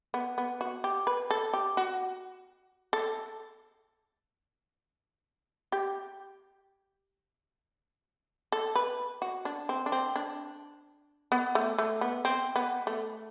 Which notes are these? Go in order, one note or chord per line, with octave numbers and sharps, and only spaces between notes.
B3
B3
F#4
G4
B4
A4
G4
F#4
A4
G4
A4
B4
F#4
D4
C4
D4
C4
D4
B3
A3
A3
B3
C4
B3
A3